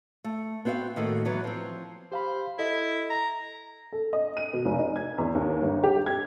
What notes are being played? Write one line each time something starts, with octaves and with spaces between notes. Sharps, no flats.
A3
B3 C4 F#4 D5 F5
A2 D#3 A3 A#3 D#4 F#4
E3 F#3 B3
F3 C4
G4 C5 F5 B5
E4 A4 D#5
A#5
A4
D#5
D#7
B2
F1
D#4
G#6
E2
D#2
G1
G4
G#6